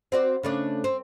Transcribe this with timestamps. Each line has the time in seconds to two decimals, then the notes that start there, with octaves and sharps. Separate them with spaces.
0.12 C4 F#4 D5
0.43 C#3 A3 D4
0.84 C4